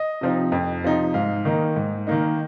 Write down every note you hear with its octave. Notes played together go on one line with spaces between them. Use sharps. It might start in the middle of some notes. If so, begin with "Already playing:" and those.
Already playing: D#5
C3 F3 C4 D#4
F2
C3 F3 C4 D#4
G#2 F5
D#3 A#3 D#4
G#2
D#3 A#3 D#4